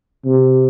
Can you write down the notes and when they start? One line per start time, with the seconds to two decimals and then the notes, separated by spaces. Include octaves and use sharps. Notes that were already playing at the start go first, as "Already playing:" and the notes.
0.25 C3